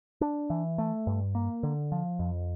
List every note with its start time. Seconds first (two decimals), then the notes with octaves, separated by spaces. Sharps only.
0.21 D4
0.50 E3
0.78 A3
1.07 G2
1.35 A#3
1.63 D3
1.92 F3
2.19 F2